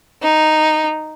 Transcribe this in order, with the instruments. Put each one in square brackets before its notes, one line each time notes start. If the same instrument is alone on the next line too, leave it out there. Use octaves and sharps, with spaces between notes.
[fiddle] D#4